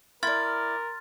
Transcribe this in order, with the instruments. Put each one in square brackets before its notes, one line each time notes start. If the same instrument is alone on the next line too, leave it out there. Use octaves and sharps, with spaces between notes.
[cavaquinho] E4 D5 [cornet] A#4 [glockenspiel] C6 F6 A6